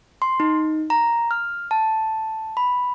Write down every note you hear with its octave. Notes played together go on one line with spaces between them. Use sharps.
C6
D#4
A#5
F6
A5
B5